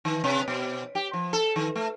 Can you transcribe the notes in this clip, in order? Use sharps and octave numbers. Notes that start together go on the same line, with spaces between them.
D#3
C3
B2
G4
F3
A4
D#3
A3